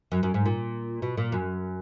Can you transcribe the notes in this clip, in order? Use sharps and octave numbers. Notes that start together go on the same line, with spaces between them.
F#2
F#2
G#2
A#2
B2
A#2
F#2